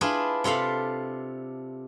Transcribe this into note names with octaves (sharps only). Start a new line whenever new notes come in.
D4 E4 F4 G#4 B4
C3 F4 A4 F5 B5